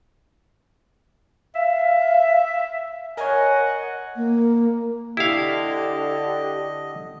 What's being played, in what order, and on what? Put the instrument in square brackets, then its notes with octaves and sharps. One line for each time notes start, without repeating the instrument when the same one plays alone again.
[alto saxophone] E5 [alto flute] F5
[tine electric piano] A#4 C#5 [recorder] D#5 [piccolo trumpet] F#5 [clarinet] G#5
[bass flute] A#3
[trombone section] D3 [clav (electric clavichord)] E4 F5 [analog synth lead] G4 [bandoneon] D#5